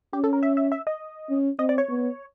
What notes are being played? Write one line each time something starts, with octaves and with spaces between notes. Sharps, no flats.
C#4 G4
A4
A#4
E5
E5
E5
D#5
C#4
C4 D#5
D5
C#5
B3